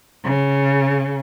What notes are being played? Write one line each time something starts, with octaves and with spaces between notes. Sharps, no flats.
C#3